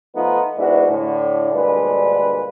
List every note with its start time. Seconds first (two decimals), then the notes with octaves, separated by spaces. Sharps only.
0.15 F3 A3 B3 D#4 F4
0.58 G#2 B3 D4 E4 F#4
0.90 A2 D3
1.53 D2 G2 A#2 G#3 B4